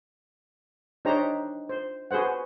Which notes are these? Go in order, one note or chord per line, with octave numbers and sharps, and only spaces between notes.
D4 D#4 G4 C5 C#5 A#5
C5
F#4 G#4 B4 C5 F#5